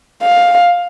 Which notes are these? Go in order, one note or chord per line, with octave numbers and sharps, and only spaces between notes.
F5